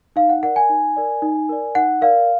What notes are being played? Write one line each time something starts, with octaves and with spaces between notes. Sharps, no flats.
D#4 F5
F#5
A#4 D5 F#5
G#5
D#4
A#4 D5
D#4
A#4 D5
D#4 F#5
A#4 D5 F5